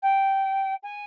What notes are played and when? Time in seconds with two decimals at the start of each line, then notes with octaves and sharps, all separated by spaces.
0.02 G5
0.83 G#5